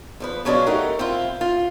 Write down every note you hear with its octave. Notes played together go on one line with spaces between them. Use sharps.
E2 F3 B4
B2 F#3 C#4 D4 F4 G#4
E2 A3 D#4 G4 A#4 F#5
C4 E4 F4
F4